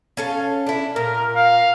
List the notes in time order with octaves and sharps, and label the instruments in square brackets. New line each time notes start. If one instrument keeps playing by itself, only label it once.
[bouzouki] C#4 A4 F5
D4 E4
[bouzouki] A#2 [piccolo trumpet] A#4
[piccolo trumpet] F5